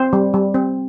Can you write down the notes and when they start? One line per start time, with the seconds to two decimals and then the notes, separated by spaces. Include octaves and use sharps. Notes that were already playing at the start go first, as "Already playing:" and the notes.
Already playing: C4 C5
0.13 G3
0.34 G3
0.54 C4